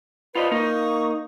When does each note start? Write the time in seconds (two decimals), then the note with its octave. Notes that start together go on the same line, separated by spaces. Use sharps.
0.35 F4 B4 C5 D5 D#5
0.51 A#3 D#4 C#6 D#6